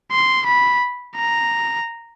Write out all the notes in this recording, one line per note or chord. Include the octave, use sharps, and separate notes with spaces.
C6
B5
A#5